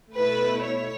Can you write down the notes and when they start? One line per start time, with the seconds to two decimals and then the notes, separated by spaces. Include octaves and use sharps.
0.14 B2 A3 E4 B4
0.63 C#5